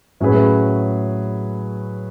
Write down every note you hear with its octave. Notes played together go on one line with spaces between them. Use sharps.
A2 F#3 C#4 G#4 B4